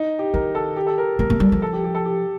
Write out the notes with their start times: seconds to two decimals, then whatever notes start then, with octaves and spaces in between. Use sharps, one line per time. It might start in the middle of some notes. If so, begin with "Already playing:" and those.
Already playing: D#4
0.19 G4
0.33 D#3 A#4
0.55 A4
0.76 G4
0.87 A4
0.98 A#4
1.19 A3 A#4
1.30 A3
1.40 G3
1.52 F3
1.62 A4
1.73 G4
1.84 G4
1.95 A4
2.05 G4